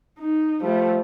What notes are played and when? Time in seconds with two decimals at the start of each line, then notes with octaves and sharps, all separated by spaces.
0.19 D#4
0.62 F3 G3 A3